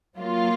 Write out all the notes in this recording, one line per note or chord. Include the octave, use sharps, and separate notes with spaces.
F#3 A#3 F4